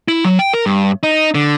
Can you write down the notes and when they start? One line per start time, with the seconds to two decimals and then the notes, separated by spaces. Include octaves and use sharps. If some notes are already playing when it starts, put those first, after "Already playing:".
0.08 E4
0.25 F#3
0.39 G5
0.53 A#4
0.66 G2
1.03 D#4
1.34 D3